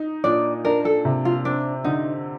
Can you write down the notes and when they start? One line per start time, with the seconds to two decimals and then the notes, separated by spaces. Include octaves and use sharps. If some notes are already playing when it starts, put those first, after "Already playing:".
Already playing: D#4
0.24 A#2 D4 D5
0.65 D4 A#4
0.85 A4
1.05 C3
1.25 F4
1.45 C4 D4
1.84 D3 D#4